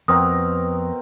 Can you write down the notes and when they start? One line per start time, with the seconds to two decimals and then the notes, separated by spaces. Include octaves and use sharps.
0.08 F2 B2 C4 A#4 D#6